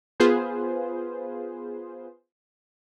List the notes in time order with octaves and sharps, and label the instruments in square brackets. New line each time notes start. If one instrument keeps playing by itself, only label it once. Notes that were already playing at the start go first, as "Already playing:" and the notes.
[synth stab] B3 F4 G#4 B4 C5